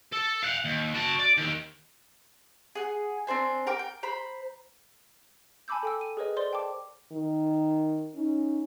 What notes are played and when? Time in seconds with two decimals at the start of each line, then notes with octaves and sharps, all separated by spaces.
0.12 A4
0.42 F5 F#5
0.65 D#2
0.94 F#4 A5
1.19 D5
1.38 D#3 A#3
2.75 G#4 F#5
3.27 C4 D4 C5 G#5
3.67 A#4 G5 D6
3.79 G5
4.03 C5 A#5 B5
5.68 G#5 A5 B5 D6 E6 G6
5.83 A4 G5 E6
6.01 D#7
6.17 G#4 A#4 B4 C#5 D#5
6.37 C5 D5 C6 G7
6.53 G5 A5 D6
7.12 D#3
8.15 C#4 D#4